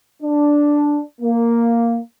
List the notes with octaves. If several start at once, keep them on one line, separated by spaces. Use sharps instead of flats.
D4
A#3